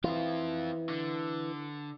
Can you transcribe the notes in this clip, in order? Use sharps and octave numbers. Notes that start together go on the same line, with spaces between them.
E3 C4 F4
D3